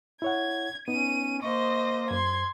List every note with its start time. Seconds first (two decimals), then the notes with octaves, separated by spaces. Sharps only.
0.22 E4 C#5 F#5 G#6
0.88 B3 C#4 D#4 D#7
1.43 A#3 C5 D#5 C#6
2.11 F#2 C5 C6 G#6